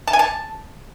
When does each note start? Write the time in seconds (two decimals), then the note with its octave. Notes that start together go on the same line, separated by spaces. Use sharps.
0.07 A5
0.13 G#5
0.19 A5